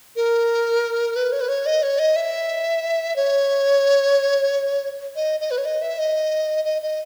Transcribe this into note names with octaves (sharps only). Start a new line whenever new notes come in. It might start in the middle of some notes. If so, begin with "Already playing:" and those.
A#4
B4
C#5
B4
C#5
D#5
C#5
D#5
E5
C#5
D#5
D#5
B4
C#5
D#5
E5
D#5
D#5
D#5